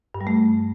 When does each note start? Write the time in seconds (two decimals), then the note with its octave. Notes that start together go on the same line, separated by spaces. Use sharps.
0.15 G2
0.21 G3
0.27 A3